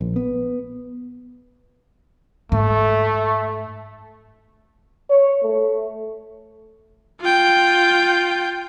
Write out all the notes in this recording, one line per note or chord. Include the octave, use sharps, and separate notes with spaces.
A#1
B3
G#2 A3
C#5
A3
F4 G5